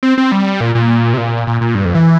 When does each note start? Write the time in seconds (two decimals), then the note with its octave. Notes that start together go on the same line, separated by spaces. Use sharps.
0.03 C4
0.18 C4
0.31 G3
0.61 A#2
0.75 A#2
1.14 C3
1.18 A#2
1.47 A#2
1.61 A#2
1.75 G2
1.85 F2
1.95 E3